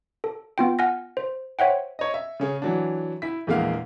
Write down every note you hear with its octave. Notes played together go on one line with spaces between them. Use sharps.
A4
B3 F4 G5
F#5 G#5 F6 A#6
C5
C5 C#5 E5 F#5 G5
C#5 D#5
E5
C#3 C#4 G#4
E3 F#3 D4
E4 B6
A#1 E2 G#3 A#3 F5